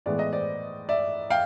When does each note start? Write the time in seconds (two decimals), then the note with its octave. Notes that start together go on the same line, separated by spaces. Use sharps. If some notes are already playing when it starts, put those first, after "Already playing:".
0.06 A2 E3 G#3 B3 D5
0.19 D#5
0.32 C5 D5
0.89 D5 E5
1.30 F5 G5